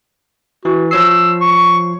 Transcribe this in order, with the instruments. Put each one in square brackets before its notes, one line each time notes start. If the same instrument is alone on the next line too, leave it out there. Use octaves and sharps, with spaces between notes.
[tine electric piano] E3 [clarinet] F#4
[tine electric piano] F3 C#5 C7 [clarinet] E6
[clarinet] C#6